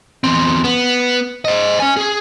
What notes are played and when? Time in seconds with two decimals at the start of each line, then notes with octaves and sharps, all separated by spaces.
0.24 E2 C4
0.64 B3
1.45 C5 D#5
1.80 C#4 G#5
1.97 G#4